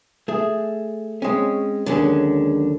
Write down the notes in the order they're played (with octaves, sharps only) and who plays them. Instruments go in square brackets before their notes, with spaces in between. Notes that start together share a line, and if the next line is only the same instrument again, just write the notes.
[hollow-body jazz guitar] A3 G#4
G#3 C4 C#4
[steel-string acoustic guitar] D#2 D3 [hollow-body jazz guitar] F#3 G#3 C#4